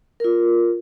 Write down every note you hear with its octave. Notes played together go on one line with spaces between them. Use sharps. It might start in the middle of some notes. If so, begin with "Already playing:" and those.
F4 A#4